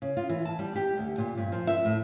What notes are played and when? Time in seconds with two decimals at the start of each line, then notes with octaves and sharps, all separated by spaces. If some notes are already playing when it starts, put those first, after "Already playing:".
0.02 C#3
0.17 F4
0.29 E3
0.45 A5
0.59 G3
0.75 G4
0.98 D2
1.18 A#2
1.37 G2
1.52 F3
1.67 E5
1.85 A2